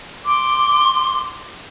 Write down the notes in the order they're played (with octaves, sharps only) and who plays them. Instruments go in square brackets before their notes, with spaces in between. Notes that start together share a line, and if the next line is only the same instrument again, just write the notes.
[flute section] C6 D6